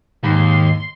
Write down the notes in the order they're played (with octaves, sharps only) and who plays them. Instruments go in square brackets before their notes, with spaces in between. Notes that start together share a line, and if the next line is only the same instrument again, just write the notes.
[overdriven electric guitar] D#2 [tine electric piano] G#2 [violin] C6